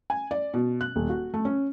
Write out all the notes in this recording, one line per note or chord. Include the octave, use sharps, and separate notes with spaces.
G#5
D5
B2
F#6
D#1
F#4
A3
C#4